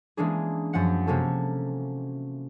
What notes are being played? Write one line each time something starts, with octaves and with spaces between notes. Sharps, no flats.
E3 G#3 A#3 C#4 D4 G#4
F#2 F3 C#4 F#5 C#7
C3 A#3 C#4 F#4 A4